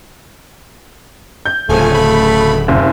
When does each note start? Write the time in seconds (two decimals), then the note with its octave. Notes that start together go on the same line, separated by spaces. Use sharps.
1.46 G6
1.69 D1 C#3 F3 A3 G#5
1.91 C#3 B5
2.68 F#1 C3